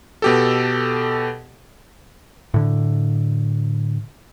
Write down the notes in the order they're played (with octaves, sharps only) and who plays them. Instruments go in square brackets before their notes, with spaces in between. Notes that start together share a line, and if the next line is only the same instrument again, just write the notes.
[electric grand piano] B2 G4 A4
[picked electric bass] A2 D3